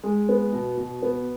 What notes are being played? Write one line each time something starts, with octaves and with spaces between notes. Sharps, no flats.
G#3
B3
B2
B2
B3